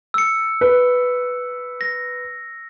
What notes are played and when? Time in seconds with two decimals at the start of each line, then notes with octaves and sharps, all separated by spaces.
0.14 E6 C#7
0.61 B4
1.81 A#6